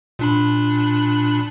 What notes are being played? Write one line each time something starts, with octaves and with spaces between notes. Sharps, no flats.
A#2 D4 B5